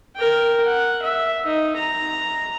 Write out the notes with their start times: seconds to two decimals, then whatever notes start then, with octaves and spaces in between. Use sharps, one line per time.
0.17 A#4 G5
0.66 F#5
1.02 E5
1.46 D#4
1.77 A#5